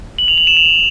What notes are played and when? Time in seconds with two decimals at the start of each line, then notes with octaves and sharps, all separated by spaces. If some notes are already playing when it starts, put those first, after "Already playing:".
0.18 F#7
0.28 F7
0.38 F#7
0.47 E7
0.57 F7